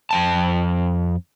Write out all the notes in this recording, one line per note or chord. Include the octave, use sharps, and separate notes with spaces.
F2 G5 A5